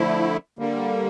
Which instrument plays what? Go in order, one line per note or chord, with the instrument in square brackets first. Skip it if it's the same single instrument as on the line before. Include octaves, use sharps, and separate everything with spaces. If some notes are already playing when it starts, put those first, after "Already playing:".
Already playing: [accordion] D3 F3 A3 E4
D3 G3 A#3